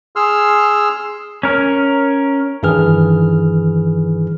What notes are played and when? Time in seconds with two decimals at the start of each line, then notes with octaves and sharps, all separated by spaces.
0.16 G#4 C6 E6 F6
1.43 C#4 A#4
2.63 G2 D#3 E3 G#4 B4 F6